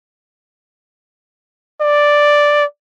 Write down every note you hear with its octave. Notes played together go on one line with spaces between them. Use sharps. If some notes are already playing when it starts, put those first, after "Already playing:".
D5